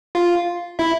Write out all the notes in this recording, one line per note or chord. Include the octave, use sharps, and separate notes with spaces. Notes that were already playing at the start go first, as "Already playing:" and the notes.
F4 F5
E4 E5